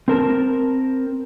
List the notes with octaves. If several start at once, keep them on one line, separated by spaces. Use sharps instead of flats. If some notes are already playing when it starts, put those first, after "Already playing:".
C4 A#4 A5